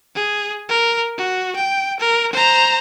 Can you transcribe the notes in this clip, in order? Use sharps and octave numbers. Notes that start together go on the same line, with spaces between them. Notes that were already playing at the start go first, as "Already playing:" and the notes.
G#4
A#4
F#4
G5
A#4
C5 A#5